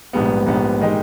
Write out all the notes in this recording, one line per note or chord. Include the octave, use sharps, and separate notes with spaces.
A#1 G#2 G3 B3
A#1 G#2 G3 B3
D#3 G#3 D#4 G4